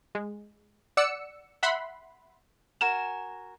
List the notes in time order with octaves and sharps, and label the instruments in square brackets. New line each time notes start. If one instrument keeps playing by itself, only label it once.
[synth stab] G#3
D5 F#5 E6 C#7
E5 F#5 B5 C6
[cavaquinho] F#4 A#4 G#5 [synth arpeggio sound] E7